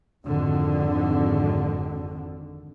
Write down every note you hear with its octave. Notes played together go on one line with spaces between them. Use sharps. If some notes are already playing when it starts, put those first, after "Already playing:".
G#1 F2 D3 D#3